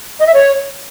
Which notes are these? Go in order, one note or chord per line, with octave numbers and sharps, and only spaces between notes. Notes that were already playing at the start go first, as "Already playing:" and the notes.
D#5
E5
C#5